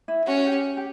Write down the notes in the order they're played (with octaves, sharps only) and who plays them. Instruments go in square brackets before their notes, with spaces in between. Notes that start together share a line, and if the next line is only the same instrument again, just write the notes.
[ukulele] E4
[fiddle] C#4 [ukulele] F#4
[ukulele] F#4
G4
G4